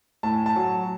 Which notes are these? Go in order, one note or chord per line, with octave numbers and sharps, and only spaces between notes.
A2 A5
G#5
A5
F#3